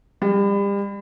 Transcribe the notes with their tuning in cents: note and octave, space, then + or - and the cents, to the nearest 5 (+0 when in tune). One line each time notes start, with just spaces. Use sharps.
G3 +35